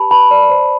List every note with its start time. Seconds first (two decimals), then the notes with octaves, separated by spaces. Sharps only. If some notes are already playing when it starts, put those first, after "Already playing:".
Already playing: G4 B4 A5 B5
0.11 B4 A5 B5
0.31 D5
0.50 C5